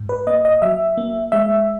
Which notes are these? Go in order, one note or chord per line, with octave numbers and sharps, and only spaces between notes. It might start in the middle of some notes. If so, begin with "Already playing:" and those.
Already playing: G#2
B4
A#3 D#5
D#5
F#3 E5
A#3
G#3 E5